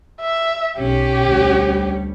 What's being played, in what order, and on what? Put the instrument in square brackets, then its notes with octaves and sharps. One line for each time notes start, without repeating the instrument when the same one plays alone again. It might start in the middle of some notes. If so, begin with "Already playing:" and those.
[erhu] E5
[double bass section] B1 [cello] C#4 [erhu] G4
[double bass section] D2 G3